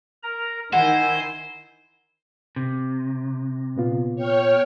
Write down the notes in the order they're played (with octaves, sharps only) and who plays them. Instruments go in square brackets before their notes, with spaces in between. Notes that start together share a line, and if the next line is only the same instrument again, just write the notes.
[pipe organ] A#4 A#5
[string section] D#3 [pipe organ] E4 G#5 [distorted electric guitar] C5 [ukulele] F#5
[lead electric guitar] C3
[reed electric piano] A#2 B3 F4
[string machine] C#5 G5 F6